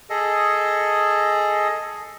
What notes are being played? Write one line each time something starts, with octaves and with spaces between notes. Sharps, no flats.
G#4 A4 D#5